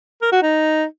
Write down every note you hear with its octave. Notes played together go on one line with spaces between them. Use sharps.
A#4
F#4
D#4